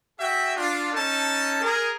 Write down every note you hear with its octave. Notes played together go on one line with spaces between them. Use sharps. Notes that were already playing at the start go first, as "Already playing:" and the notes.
F#4 G#4 E5 G5
D4 F4
C#4 D#4 A4 A5
G#4 A#4